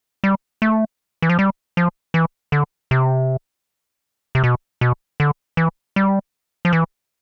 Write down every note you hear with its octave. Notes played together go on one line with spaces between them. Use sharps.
G3
A3
E3
F3
G3
F3
E3
D3
C3
C3
B2
B2
D3
E3
G3
F3
E3